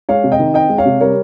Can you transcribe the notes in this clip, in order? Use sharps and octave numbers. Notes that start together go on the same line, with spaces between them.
G#3 C#5 F5
C3
D#5 G5
D#3
C4 D#5 G5
G#3
C#5 F5
C3
G3 A#4 C#5